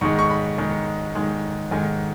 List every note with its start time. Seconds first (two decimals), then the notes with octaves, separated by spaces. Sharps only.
0.01 G#2 D#3 G#3 C#6
0.19 C#6
0.30 B5
0.58 G#2 D#3 G#3
1.15 G#2 D#3 G#3
1.71 G#2 D#3 G#3 G#5